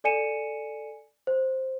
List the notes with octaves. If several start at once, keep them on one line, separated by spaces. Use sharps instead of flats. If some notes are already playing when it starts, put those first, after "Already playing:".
A4 D5 G#5 C#7 D#7 E7
C5